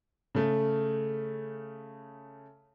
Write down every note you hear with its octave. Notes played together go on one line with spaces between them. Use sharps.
C#3 A3